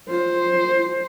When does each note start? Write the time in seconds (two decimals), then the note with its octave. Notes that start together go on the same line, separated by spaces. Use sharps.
0.10 F4 C5